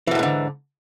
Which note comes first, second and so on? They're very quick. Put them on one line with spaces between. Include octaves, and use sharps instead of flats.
E3 B2 E2 G#2 D3